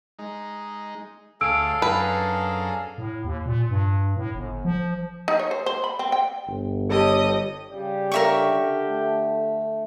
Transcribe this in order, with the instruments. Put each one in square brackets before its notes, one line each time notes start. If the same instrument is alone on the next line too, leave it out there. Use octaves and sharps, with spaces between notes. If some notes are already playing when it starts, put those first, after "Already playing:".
[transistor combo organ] G#3 D#4
[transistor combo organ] D2 C#5 A5 [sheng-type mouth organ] G#4 A4 F5 [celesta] E6 D7
[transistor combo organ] F#2 D4 A#5 [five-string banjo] B4
[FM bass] A2
D#2
A#2
G2
A2
G1
F3
[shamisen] D#4
C#5
C5
C5
B5
C4
G5
[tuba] G1
[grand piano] G3 A4 C#5 [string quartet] G4 D#5 D#6
[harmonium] C#3 G3 [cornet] G4
[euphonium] D3 [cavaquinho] A#4 E5 C#6
[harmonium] A3